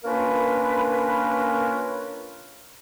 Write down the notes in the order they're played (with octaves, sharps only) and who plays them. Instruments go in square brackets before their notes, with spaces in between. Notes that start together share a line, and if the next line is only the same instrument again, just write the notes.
[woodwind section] A#3 C#4 D4 F4 A#4 B4